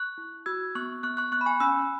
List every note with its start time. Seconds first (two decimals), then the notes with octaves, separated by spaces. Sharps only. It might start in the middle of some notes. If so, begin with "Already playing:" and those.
Already playing: C#6 F#6
0.18 E4
0.46 F#4 E6 G#6
0.75 B3 C#6 F#6
1.03 B3 C#6 F#6
1.17 C#6 F#6
1.32 B3 C#6 F#6
1.41 B5
1.46 G#5 C#6
1.60 C#4 B5 E6